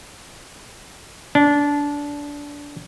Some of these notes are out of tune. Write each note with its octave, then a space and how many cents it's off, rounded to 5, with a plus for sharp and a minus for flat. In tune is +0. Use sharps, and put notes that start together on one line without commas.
D4 -20